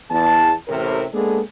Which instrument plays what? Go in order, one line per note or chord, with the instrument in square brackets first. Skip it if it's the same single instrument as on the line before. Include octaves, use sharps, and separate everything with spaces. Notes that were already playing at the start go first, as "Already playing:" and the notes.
[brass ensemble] E2 A5
A1 A2 C3 A#4
G#3 A#3 B3 D4 G#4 A4